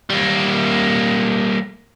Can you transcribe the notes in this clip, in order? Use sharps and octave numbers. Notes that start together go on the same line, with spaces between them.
G3 A#3